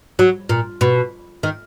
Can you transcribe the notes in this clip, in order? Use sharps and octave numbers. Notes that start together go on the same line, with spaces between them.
F#3
A#2
B2
D#3